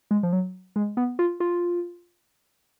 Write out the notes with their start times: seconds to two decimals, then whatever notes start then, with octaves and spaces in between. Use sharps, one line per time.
0.11 G#3
0.23 F3
0.33 F#3
0.76 G#3
0.97 B3
1.19 F4
1.40 F4